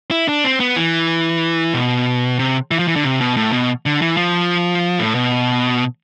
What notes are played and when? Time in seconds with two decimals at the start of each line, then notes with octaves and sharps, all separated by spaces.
0.11 E4
0.28 D4
0.44 C4
0.60 B3
0.76 E3
1.74 B2
2.39 C3
2.71 E3
2.79 F3
2.88 E3
2.96 D3
3.04 C3
3.21 B2
3.37 A2
3.52 B2
3.86 D3
4.02 E3
4.17 F3
4.99 A2
5.15 B2